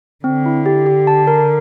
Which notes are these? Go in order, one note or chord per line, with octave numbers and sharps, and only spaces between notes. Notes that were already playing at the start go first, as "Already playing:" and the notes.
D3 C4
E4
G4
G4
A5
A#4